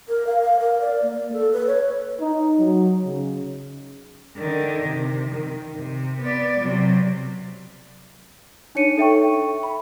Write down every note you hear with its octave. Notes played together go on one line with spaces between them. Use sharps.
A#4
F5
F5
A#4
D5
A#3
A4
B4
C#5
D#4
F#3
C#3
D3 D#3
C3
D#3
C3
B3 D5
C3 F#3
D4 D#4 C#5 C#7 D#7
A4 E5 G5 C#6
B5